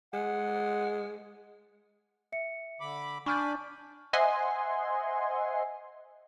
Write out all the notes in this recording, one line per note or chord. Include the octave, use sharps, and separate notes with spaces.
G#3 F#5
E5 C#7
D3 B5 D6
D4 G#5 B5 C#6 D6 F6 G6
C5 D#5 E5 F#5 G#5 C6